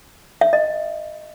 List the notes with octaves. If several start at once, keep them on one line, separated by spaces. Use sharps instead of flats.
E5
D#5